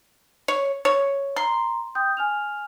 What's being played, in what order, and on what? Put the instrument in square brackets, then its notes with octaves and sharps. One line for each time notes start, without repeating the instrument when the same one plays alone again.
[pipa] C#5
C#5
[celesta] A#5 [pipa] C6
[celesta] G5 D#6 G6
G#5 F6 F7